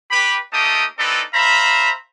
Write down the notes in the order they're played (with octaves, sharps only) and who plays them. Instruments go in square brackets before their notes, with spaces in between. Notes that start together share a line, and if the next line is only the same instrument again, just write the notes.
[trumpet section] G4 B4 B5
A3 A#3 D#4 G4 A5 D#6
C4 D#4 E4 A4 B4 D5
C5 E5 F5 A#5 B5